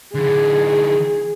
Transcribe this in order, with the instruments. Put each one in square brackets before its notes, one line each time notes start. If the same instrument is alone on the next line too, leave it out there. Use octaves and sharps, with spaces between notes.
[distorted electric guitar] D3 E3 [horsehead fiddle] G#4